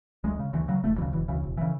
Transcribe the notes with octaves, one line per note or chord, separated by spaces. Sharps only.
D2 G#3
C#3
D2 E3
C#3 F#3
E1 A3
D2 C#3 E3
E1 E3
D2 C#3 E3
E1
C#3 E3